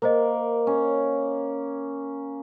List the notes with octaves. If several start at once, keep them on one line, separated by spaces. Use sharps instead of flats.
A#3 A#4 C5 D#5
C#4